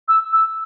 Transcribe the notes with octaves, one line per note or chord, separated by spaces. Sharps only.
E6
E6